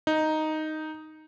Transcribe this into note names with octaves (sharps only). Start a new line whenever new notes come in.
D#4